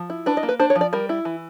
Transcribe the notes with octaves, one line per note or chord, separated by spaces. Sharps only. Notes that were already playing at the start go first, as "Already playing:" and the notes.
Already playing: F3
E4
D4 B4
D#5
A#3
B4
D4 C5
C#5
F3
D5
G3 A#4
E4
E3